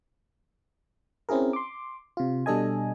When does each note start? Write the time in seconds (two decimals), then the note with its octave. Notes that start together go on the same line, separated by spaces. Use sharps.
1.29 C4 C#4 E4 G#4 A#4
1.53 C6 D6
2.17 C3 F4
2.46 B2 G3 D4 A4 D#5 G#5